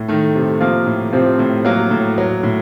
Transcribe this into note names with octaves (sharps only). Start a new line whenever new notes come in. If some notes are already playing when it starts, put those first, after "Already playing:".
Already playing: A2
D#3 A3
C3
F3 A#3
A2
C3 F3 C4
A2
F#3 A#3
A2
F#3
A2